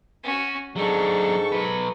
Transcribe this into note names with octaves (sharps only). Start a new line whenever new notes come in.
C#4 F#4
G#2 F#3 D4 A4 C#6
F#3 B4